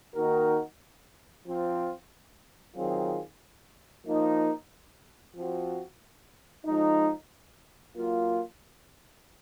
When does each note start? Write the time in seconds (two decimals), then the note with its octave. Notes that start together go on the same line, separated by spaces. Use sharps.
0.15 D#3 A#3 D#4 F#4 A#4
1.45 F3 C4 F4
2.75 D#3 F#3 C4 F4 G#4
4.05 F3 A#3 D#4
5.35 F3 C4 F#4
6.66 F3 G#3 D#4
7.96 F#3 A#3 F4